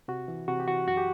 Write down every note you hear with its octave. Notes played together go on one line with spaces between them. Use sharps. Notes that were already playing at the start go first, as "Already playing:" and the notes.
C3 F#4
E3
C3 F#4
G4
E3 F#4
F#2 F#4
G4